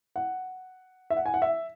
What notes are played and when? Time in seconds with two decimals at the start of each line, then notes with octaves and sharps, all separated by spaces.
0.16 F#5
1.10 E5
1.17 F#5
1.26 G#5
1.34 F#5
1.42 E5